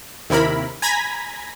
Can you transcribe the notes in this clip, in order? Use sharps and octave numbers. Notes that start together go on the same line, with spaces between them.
D#2 C3 E4 A#4 B5
G#5 A#5 B5 G#6 A#6 B6